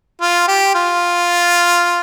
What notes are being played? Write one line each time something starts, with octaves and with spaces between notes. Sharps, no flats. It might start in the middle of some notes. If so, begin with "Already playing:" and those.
F4
G4
F4